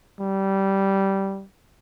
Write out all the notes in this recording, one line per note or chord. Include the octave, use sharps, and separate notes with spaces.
G3